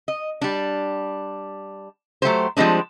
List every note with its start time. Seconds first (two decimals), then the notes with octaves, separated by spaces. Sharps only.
0.08 D#5
0.41 G3 D4
2.22 F#3 A3 G4 C5
2.57 F3 G3 G#3 C4 D4